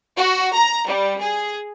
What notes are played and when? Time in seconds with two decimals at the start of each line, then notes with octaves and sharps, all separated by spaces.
0.15 F#4
0.54 A#5
0.86 G3
1.20 G#4